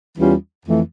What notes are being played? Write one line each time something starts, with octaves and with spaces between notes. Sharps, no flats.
E2 E3 G3 C#4 F4
F2 E3 A3